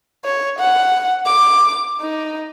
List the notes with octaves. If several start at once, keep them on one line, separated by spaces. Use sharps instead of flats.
C#5
F#5
D6
D#4